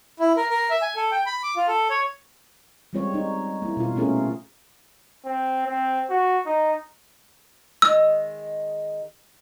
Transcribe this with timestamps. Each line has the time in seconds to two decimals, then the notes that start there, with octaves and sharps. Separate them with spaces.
0.20 E4
0.37 A#4
0.50 A#4
0.70 E5
0.82 G#5
0.96 A4
1.12 G5
1.26 B5
1.43 D6
1.56 F4
1.68 A4
1.90 C#5
2.93 G3 G#3 C4 F4 C#5
3.14 D#4
3.62 A#3 E4
3.77 B2 F4
3.95 A#2 A3 C#4 F4 G#4 A#4
5.25 C4
5.67 C4
6.10 F#4
6.46 D#4
7.82 D#3 G#3 E6